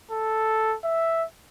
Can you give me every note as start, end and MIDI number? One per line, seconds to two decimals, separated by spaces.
0.11 0.75 69
0.84 1.24 76